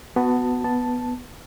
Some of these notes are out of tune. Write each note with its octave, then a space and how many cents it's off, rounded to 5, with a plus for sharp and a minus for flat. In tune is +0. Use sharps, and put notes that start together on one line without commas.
B3 +10 F#4 +0 A5 +10
B3 +0 A5 +0